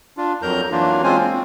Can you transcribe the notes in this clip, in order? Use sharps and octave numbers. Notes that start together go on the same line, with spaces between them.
D4 F4
F2 F#3 A#4 A#5 G6
E3 F#3 A#3 D4 F4
G#3 C4 C#4 F4 C5 G#5
C4